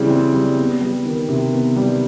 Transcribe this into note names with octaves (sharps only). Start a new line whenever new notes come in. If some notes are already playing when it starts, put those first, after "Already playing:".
Already playing: C#3 E3 G3 C4
C4
G3
B3
G3
D#3
C3
B3
G3